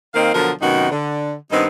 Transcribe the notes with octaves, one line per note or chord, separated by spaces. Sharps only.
D#3 A#3 C4 D#4 F5
B2 D3 F3 F#3 F4 A#4
F#2 C3 D#3 B3 D#4 F#4
D3
G2 D#3 B3 C4 D#4